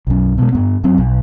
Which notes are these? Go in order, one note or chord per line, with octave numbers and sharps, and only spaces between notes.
B1 F#2
B2 G#3
G2 B3
F#2 F#3 C4
B1